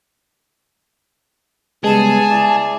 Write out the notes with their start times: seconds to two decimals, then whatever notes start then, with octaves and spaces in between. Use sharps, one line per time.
1.84 C#3 G3 G#3 B3 G#4 A5
2.31 E4 D5